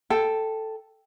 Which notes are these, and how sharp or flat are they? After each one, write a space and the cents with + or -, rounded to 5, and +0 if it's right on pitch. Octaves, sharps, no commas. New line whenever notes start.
A4 +0 G5 +0